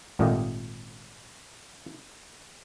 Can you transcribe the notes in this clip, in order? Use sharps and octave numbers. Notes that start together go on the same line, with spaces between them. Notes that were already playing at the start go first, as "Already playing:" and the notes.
G#1 A#2 A3 G4 D#5